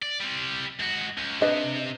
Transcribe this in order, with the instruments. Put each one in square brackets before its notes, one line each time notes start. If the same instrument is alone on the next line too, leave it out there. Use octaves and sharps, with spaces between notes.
[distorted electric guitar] D5
G3 C4
G#2 F#4
C#2
[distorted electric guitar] C3 [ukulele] D4 B4 D#5